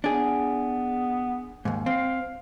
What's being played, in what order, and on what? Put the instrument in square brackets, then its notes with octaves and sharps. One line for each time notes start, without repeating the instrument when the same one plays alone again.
[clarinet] B3 [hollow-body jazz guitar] D4 G#4
[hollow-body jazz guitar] D#2 G#2
[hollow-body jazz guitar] C4 [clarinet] F5